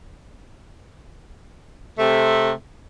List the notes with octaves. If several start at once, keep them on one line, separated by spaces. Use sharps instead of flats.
C3 A3